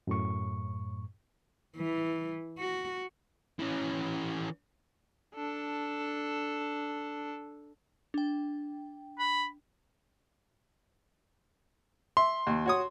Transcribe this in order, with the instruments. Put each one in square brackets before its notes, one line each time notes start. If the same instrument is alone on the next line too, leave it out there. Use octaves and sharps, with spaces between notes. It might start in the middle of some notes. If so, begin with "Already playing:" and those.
[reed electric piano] F#2 A2 C#6
[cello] E3
F#4
[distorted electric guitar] E3 C#4
[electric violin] D4 A4
[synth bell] D4 G5
[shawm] B5
[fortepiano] E5 [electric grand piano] C6
[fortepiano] D#2
F#4 C#5 D#6